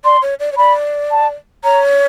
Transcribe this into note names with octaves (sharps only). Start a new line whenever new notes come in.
D5 C6
C#5
D5
C#5
D5 B5
A5
C#5 A#5